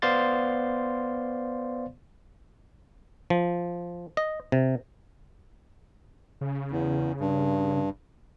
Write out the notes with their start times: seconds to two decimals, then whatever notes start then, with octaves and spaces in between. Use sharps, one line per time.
0.02 B3 C5 D5 F5 C6 A6
3.30 F3
4.17 D#5
4.52 C3
6.41 C#3
6.71 E2
7.20 G2